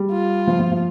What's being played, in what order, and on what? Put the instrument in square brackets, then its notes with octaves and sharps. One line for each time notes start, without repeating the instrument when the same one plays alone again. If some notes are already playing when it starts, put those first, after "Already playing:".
Already playing: [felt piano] G3
[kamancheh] F4
[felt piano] F3
F3
F3